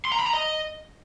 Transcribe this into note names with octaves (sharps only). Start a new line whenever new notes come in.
C6
A#5
B5
A#5
D#5